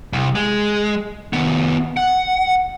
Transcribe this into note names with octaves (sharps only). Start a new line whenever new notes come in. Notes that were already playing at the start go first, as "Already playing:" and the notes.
C2
G#3
D#3 B3
F#5